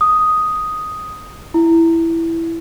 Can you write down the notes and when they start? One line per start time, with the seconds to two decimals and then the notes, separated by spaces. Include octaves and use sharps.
0.01 D#6
1.54 E4